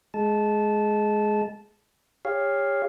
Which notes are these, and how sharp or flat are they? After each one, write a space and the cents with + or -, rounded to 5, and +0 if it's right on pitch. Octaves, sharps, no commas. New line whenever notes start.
G#3 +15 A5 -15
G4 +40 C#5 +0 F5 +0